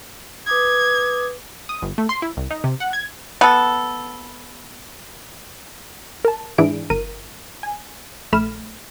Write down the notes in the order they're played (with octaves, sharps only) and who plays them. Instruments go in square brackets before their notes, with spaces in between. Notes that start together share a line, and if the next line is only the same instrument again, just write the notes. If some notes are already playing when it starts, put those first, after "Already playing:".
[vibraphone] B4 D6 D#6 [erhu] G#6
[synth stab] D#6
G1
A3
C6
E4
C2
D#4
C3
F#5
G#6
[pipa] B3 A4
[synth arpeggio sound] A#4 A5
G#2 E3 D4 E4 G#4 D7
G1 A#4 D#7
G#5
A#1 A3 B5 F6 E7